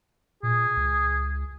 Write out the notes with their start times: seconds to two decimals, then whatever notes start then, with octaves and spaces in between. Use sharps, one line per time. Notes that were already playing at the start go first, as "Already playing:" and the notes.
0.43 A#2 G#4
0.76 C#2